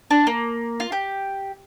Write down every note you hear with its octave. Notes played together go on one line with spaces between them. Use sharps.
D4
A#3
F4
G4